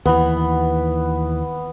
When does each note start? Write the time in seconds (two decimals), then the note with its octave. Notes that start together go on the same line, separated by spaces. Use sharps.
0.05 D#2 E3 B3